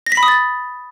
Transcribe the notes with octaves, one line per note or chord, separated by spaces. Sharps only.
A#6
B6
B5
D#6
A6